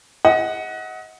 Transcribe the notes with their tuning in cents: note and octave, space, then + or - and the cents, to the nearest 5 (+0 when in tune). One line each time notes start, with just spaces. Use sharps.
G#4 -30 D#5 +30 F#5 +0